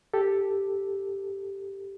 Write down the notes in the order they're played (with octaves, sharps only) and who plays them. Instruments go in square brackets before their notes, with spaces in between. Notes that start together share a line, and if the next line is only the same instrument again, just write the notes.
[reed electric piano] G4 A4